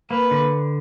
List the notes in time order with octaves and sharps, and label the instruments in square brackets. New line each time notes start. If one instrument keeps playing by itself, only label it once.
[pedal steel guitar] A#3 [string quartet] B4
[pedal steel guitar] D3